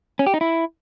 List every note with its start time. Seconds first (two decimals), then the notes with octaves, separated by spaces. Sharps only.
0.19 C#4
0.27 G4
0.34 D#4
0.41 E4